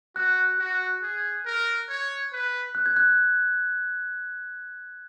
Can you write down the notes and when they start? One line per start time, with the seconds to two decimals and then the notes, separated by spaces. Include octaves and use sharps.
0.16 F#4 F#6
0.59 F#4
1.03 G#4
1.46 A#4
1.89 C#5
2.32 B4
2.75 F#6
2.86 G#6
2.96 F#6